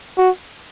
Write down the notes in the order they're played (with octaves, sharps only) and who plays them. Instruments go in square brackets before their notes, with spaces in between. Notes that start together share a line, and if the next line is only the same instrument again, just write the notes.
[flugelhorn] F#4